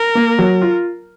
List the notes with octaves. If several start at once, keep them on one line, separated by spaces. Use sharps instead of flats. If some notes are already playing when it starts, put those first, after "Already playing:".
Already playing: A#4
A#3
F#3
F4